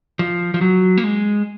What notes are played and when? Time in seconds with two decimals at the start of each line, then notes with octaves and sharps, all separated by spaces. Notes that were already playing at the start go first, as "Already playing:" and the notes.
0.19 F3
0.54 F3
0.61 F#3
0.97 A#3
1.04 G#3